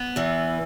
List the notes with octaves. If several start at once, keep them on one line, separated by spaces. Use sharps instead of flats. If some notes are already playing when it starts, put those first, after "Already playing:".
Already playing: B3
E2 E3